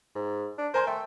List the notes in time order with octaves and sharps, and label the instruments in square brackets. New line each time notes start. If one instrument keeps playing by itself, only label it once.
[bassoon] G#2
D4
[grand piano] A#4 G#5 C6 [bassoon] C5
[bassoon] A3 [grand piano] G5